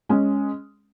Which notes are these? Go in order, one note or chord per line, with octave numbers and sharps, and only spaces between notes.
G#3 C#4